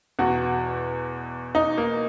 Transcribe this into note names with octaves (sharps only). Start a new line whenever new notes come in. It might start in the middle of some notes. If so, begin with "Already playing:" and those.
E2 B2 F#4
D#4
A#3